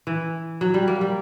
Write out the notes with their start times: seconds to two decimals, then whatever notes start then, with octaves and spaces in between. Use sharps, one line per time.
0.07 E3
0.61 F#3
0.74 G3
0.88 A#3
1.01 G3